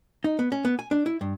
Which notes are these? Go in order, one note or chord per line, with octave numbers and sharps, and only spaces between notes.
D#4
B3
C#4
B3
G#5
D4
E4
G2